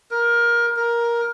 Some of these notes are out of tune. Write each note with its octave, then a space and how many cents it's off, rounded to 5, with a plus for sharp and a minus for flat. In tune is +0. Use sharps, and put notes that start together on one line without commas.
A#4 +20
A#4 +15